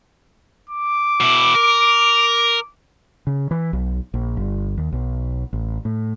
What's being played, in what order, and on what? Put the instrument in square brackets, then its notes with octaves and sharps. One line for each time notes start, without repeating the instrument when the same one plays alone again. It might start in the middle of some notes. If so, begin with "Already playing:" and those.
[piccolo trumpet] D6
[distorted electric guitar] B2 E4
A#4
[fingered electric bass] C#3
E3
B1
A#1
G1
D#2
B1
A1
A2